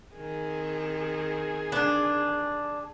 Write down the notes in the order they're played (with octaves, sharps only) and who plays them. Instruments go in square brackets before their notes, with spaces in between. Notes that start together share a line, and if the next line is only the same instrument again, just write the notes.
[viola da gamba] D#3 C4 [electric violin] G#4
[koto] D3 B3 [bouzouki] D4